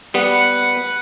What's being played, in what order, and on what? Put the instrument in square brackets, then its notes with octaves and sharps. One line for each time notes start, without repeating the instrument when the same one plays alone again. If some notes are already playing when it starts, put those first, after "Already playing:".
[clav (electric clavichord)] G3 B3 [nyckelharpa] B4 F#5